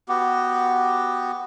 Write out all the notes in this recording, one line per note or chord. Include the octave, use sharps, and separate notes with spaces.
B3 F#4 G4